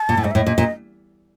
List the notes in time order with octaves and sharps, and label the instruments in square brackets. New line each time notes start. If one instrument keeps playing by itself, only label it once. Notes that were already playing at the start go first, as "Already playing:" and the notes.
Already playing: [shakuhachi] A5
[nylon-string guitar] A#2
A2
[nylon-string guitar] G#2 [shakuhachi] D#5
[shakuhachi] E5
[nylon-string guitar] A2
[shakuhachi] D#5
[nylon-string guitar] A#2
A#2